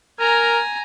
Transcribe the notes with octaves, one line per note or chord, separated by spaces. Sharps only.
A#4 G#5 A#5